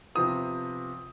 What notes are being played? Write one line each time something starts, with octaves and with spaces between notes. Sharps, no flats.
C3 F3 B3 D#6